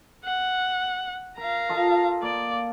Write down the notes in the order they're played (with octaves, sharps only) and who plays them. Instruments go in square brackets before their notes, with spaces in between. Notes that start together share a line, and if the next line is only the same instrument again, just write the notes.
[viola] F#5
[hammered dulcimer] A#4 [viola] F5 A#5
[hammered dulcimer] F4 A4 D#5
[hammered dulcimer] A#3 [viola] D5